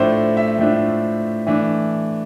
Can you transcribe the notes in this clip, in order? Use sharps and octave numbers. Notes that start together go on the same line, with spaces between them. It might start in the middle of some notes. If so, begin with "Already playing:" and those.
Already playing: A2 F3 A3 D4 C5
E5
A2 F3 A3 D4
E3 A3 D4